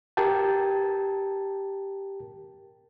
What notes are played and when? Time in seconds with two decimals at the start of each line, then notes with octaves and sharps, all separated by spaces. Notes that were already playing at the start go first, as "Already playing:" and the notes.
0.17 G4 A#4 G5 A5